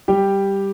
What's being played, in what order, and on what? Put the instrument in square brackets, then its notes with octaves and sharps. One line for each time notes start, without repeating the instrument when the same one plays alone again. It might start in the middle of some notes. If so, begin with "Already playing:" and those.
[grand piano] G3 G4